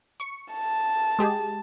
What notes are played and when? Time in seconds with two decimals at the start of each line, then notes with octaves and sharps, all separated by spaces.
0.20 C#6 C#7
0.53 A5
1.19 G#3 G4 G#4